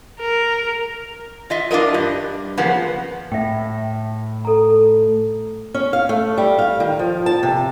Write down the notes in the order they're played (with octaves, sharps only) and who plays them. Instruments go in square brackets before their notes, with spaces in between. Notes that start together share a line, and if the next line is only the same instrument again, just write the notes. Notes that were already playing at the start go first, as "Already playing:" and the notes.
[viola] A#4
[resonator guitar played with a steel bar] F4 D#5 E5
D4 F4 A#4 D#5
G2
C#3 F3 A#3 B3
[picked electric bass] A2 [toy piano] E5 G5
[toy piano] A4 A#5
[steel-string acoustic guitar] C#4
F5
A3
G3
F5
D#3
F3
A5
C3